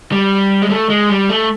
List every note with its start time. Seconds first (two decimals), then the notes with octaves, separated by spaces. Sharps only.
0.12 G3
0.62 G#3
0.70 A3
0.90 G#3
1.09 G3
1.29 A3